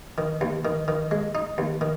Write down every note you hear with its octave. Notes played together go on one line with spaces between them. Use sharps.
D#3
D#2
D#3
D#3
G#3
D#4
D#2
D#3